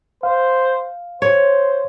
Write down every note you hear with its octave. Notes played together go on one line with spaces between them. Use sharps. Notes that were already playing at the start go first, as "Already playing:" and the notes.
C5 F5
C5 C#5